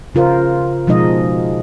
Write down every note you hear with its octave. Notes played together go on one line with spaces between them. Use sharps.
C#3 F4 A#4 C5
B2 F3 G#3 D#4 D#5